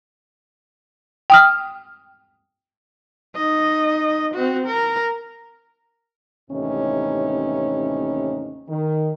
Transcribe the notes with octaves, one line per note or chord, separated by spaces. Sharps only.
G5 D#6 F6
D#4 D#5
C4 F#4
A#4
D#2 A2 C3 E3 C#4 D#4
D#3